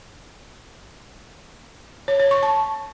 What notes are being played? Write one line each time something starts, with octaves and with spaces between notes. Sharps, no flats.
C#5
C#5
C#6
A5